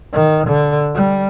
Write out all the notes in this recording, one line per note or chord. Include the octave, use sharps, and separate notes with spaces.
D#3
D3
G3